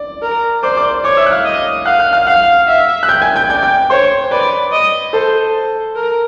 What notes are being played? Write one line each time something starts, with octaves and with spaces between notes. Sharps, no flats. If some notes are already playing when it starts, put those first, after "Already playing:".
Already playing: D5
A#4
C5 D5 D6
D5 D6
C#5 D5 D6
E5 E6
F#6
F5 F6
D#5
F5 F#5 F#6
F#5 F#6
F5 F6
F5 F#5 F#6
E5
F#6
G5 G6
G#5 G#6
G5 G6
D5 G5 G6
G5 G6
C5 C#5 C6
B4 D5 B5
D#5
A4 C5 A5
A#4